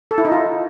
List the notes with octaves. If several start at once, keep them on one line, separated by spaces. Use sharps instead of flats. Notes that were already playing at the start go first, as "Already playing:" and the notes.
A4
E4
D#4
F4